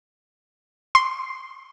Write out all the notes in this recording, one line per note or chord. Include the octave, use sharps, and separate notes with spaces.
C6